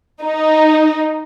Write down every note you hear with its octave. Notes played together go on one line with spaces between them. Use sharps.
D#4